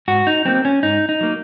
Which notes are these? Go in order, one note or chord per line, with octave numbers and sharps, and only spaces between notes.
G#2 F#4
D#4
F#3 A#3 C4
C#4
G#2 D#4
D#4
F#3 A#3